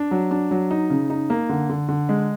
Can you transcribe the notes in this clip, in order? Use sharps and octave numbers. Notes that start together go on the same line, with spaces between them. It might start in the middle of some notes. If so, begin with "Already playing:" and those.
Already playing: D4
F#3
D4
F#3
D#4
C#3
D#4
A#3
D3
D3
D3
G#3